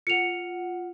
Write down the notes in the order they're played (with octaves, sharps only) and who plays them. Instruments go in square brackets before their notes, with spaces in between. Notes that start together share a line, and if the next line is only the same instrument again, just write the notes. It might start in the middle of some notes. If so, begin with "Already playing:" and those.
[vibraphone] F4 F#5 [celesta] C#7 F7